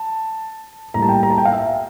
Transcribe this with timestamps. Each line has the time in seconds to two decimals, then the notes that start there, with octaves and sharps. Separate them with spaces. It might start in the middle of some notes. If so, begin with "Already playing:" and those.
Already playing: A5
0.94 A2 G3 A#3 A#5
1.02 A5
1.09 G5
1.23 A#5
1.30 A5
1.38 G5
1.45 F5
1.52 E5